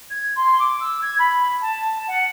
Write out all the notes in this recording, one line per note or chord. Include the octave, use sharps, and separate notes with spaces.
G#6
C6
D6
E6
G#6
B5
A5
F#5